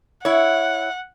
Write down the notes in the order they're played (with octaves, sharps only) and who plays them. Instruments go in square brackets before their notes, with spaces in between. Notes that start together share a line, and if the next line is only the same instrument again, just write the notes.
[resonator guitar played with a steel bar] E4 C#5 [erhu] F#5